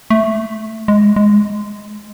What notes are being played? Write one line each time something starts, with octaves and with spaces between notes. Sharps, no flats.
A3
G#3
G#3